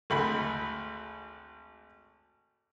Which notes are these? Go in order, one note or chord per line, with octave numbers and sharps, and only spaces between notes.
G#1 D2 B5